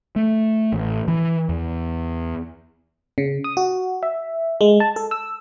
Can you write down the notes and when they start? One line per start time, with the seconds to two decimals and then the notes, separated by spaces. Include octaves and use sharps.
0.16 A3
0.73 A1
1.08 E3
1.49 E2
3.18 C#3
3.44 D#6
3.57 F#4
4.03 E5
4.61 G#3
4.80 A5
4.96 A4
5.11 E6